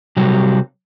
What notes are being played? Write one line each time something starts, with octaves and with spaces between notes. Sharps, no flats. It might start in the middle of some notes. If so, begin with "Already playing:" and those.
C3 F#3 G3